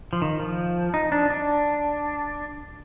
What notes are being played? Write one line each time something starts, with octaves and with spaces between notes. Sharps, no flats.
F3
D#3
F3
D#4
D4
D4